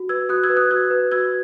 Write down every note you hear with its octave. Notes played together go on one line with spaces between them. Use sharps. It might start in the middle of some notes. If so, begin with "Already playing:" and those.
Already playing: F#4
B4 E6 G#6
F#4 D#6 F#6
E6 G#6
B4
D#6 F#6
F#4 E6 G#6
B4
F#4 E6 G#6